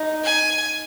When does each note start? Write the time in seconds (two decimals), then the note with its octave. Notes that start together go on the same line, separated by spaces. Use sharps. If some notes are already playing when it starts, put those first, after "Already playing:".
Already playing: D#4
0.24 G#5